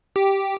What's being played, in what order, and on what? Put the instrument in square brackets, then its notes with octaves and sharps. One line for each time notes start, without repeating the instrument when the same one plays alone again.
[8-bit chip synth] G4